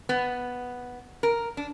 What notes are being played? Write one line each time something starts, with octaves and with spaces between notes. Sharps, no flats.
B3
A#4
D4